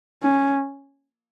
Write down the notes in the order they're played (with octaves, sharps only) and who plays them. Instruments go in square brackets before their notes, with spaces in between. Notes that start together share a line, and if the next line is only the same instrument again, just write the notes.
[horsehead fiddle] C#4